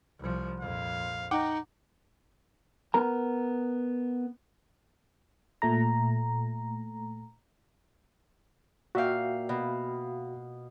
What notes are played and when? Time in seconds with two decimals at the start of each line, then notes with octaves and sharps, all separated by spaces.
0.19 C2 F3
0.60 A#1 F2 F5
1.31 D#4 F#5 G5 D6
2.94 B3 A#4 A#5
5.62 A#2 A3 A#5
8.95 A#2 F#4 E5 F5 G5
9.49 B2